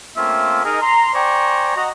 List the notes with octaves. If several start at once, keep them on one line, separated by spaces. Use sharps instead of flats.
A3 A#3 C4 C#4 F4 E5
D#4 G#4 A#4
A#5 C6
C5 D5 G5 G#5 A#5 C#6
F#4 D#5 A#5